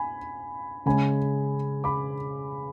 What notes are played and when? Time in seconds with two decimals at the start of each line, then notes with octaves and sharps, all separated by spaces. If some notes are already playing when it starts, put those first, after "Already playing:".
Already playing: G#5 B5
0.86 C#3 G#3 C#4 G#5 B5
1.84 B5 D6